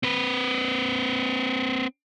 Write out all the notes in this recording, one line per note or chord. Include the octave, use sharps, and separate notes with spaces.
C4 B4